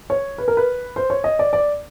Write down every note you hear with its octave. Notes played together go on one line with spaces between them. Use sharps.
C#5
B4
A#4
B4
C5
C#5
D#5
D5
D5